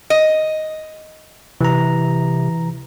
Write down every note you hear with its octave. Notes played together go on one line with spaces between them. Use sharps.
D#5
C3 E3 A#5